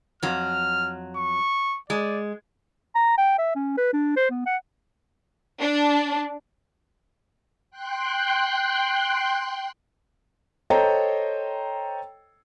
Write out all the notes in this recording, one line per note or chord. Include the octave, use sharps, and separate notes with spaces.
F2 F#3 F6
C#6
G#3 D5
A#5
G5
E5
C#4
B4
D4
C5
B3
F#5
D4
G5 C6 F#6
A4 C5 C#5 D#5 G5 A#5